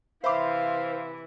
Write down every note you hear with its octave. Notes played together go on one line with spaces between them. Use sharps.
C3 E3 C5 E5 F5 B5 D6